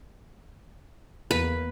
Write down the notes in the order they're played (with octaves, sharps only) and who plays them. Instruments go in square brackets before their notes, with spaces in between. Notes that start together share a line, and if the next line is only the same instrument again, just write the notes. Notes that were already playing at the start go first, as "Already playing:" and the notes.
[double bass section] E2 A#3 [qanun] B4